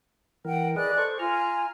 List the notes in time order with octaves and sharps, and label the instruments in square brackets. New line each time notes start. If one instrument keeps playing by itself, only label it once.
[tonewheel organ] E3 A#4 [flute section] F#5 G5
[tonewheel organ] G#4 B4 D#5 [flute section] D5 F#6
[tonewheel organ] A4 C5 C#6
[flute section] F4 G#5 [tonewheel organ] A#5 F6